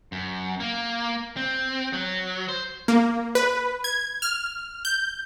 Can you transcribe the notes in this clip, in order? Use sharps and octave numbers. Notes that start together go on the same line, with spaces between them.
F#2
A#3
C4
F#3
C5
A#3
B4
G#6
F6
G6